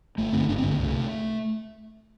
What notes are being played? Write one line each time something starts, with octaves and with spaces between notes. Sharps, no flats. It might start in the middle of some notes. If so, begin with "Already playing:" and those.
G1 A3
G2 D3 C4
G1 D4
C4
G2 D3 A3
C2
C3